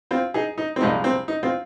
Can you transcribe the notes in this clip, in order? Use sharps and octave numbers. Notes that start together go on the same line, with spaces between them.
C4 F4
D#4 G#4
D#4
C4
C2 A#2 F3 G#3 D#4
C4
D#4
C4 F4